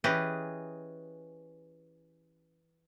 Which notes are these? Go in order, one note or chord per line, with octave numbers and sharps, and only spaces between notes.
E3 C#4 G4 G#4 B4 D#5